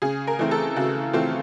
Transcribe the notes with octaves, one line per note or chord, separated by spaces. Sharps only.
C#3 G#4
A#4
E3 A3 C4
A4
C#3 F#4
E3 A3 C4 F4